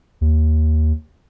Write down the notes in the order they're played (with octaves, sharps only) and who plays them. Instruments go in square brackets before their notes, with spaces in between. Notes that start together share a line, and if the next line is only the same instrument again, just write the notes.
[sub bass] D#2